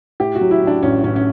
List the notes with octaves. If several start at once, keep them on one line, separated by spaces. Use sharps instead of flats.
A2 G4
F#4
F#3
E4
A2
D4
A1 C#4
A1 C#4
C#4